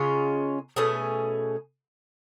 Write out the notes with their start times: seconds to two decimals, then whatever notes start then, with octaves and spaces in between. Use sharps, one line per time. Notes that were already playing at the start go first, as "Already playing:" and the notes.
Already playing: C#3 G#3 C#4 F4
0.76 B2 A3 C#4 G#4